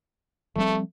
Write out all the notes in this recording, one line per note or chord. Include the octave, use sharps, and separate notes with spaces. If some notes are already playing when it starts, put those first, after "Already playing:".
F3 G3 A3 C4